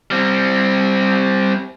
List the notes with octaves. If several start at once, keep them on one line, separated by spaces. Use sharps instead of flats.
G3 C4